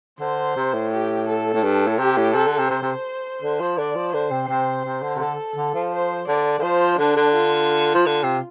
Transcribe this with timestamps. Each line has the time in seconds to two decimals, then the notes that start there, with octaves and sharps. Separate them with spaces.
0.20 D3 C5
0.56 C3
0.74 A2
0.92 G4
1.28 A4
1.54 A2
1.63 G2
1.87 A2
1.98 C3 G4
2.17 A2
2.34 C3 A4
2.47 D3
2.58 C3
2.70 C3 C5
2.82 C3
3.42 D3
3.60 F3
3.77 D3 D5
3.95 F3
4.13 D3 C5
4.31 C3
4.48 C3 C5
4.85 C3
5.02 D3
5.16 C3
5.20 D3 A4
5.56 D3
5.74 F3
5.92 C5
6.28 D3 D5
6.59 D3
6.63 F3 C5
6.98 D3 D4
7.16 D3
7.35 F4
7.94 F3
8.06 D3
8.23 C3